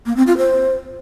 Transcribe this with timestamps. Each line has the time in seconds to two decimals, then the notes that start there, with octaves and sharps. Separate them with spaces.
0.06 A#3
0.16 C4
0.27 F4
0.37 C5